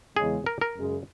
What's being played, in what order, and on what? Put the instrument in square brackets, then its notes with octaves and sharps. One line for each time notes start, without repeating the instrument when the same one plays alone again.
[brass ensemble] E2 C#3 G#3 [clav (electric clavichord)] G#4
[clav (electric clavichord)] A#4
A#4
[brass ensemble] F#2 C#3 G#3